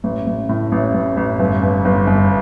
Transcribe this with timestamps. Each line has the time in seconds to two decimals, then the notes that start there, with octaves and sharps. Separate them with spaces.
0.04 A1
0.27 A1
0.49 A2
0.72 A1
0.94 A1
1.17 A1
1.39 G1
1.63 G1
1.85 G1
2.07 G1